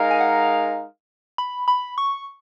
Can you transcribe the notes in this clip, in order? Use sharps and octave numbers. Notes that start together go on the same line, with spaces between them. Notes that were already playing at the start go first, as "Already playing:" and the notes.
Already playing: G#3 D#4 A#4 F5
G#5
F#5
B5
B5
C#6